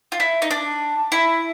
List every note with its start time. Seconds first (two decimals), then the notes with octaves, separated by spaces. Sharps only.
0.12 F4
0.20 E4
0.42 D#4
0.51 D4
1.12 E4